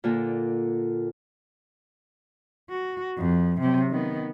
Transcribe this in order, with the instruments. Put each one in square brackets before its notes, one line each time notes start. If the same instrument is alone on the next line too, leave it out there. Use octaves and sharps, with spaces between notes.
[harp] A#2 D3 A#3
[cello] F#4
F2
C3 F#3
D#3 B3